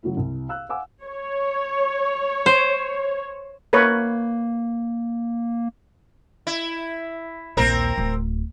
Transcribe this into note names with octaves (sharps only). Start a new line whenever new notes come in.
C#3 F#3 A3 E4
C2
F5 E6 F#6
F5 F#5 G#5 D6 E6
C#5
C5
A#3 A#4 B4 C#5
E4
A#1 D#2 C4 A#4
D1